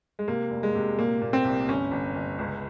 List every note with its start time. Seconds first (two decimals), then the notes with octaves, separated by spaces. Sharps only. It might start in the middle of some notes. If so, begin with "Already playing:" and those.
0.19 G#3
0.28 C3 A#3
0.51 F1
0.63 G#3
0.75 C3
0.98 A#2 A#3
1.21 A#2
1.33 C4
1.44 C2
1.68 G1 C#4
1.91 G1
2.15 G1
2.39 C#2